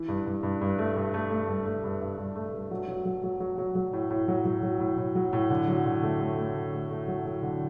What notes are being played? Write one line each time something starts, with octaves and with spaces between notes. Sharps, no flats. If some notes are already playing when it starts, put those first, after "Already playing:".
Already playing: E3
G2
G2
G2
G2
A3
G2
A3
A3
G2
A3
G2
G2
G2
A3
G2
F#3
F#3
F#3
F#3
F#3
F#3
F#3
A2
A2
F#3
F#3
F#3
A2
A2
F#3
A2
D3
F#3
D3
A3
A3
A3
D3
A3
A3
F#3
F#3
D3